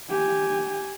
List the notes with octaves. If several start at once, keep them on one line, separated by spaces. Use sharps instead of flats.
G4 G#5